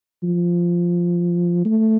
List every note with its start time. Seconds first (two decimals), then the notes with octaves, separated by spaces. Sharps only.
0.23 F3
1.65 A3